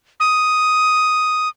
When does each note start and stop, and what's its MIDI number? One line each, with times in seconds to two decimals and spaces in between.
0.20 1.49 87